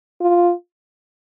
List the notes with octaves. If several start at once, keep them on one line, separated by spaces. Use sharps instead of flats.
F4